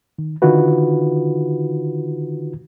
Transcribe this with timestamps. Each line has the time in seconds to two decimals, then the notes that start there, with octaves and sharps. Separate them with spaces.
0.18 D#3
0.42 D3 D#3 D#4 F4 F#4 B4